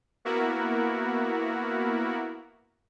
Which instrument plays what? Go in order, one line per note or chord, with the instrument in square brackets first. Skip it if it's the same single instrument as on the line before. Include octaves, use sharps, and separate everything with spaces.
[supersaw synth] A#3 B3 E4 F#4 A#4